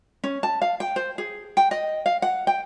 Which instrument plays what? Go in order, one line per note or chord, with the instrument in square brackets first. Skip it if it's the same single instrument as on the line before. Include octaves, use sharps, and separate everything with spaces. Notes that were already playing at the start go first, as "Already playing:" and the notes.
[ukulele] C#4
A5
F5
G5
C5
G#4
G5
D#5
F5
F#5
G5